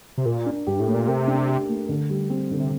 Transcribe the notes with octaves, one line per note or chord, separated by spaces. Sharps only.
C3
A#2 A#4
D4
G2 G4
A2
A3
A#2
C3 A#4
D4
G4
A3
D3
G3
C4
D3
C3